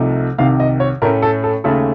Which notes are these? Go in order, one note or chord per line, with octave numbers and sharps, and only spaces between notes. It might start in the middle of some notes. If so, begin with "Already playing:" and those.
Already playing: C2 C3 F3 A3 D#4
C2 C3 D#3 F5
D#5
C#5
A2 A3 C#4 A#4
A4
A4
D#2 C#3 A3 A4